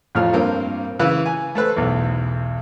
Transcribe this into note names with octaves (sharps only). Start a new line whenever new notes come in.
A1 F2 A2 F4 F6
G2 A#3 C4
C#3 E3 B4
G#5
A3 A4 B4 C5
B1 E2